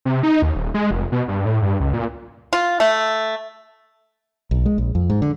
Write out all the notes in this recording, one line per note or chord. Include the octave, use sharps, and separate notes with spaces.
C3
D#4
D#2
D#1
G#3
F1
B2
G2
A2
G2
C#2
A#2
F4
A3
B1
G#3
A#1
F2
G#2
D3